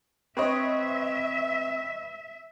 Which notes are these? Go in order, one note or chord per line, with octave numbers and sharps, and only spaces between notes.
C4 B4 C#5 D#5 E5